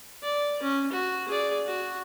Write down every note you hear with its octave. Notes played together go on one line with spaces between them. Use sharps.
D5
C#4
F#4
G#4 D5
F#4